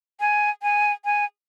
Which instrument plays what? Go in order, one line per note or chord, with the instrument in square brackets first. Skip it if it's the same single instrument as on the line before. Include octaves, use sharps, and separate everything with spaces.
[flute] G#5
G#5
G#5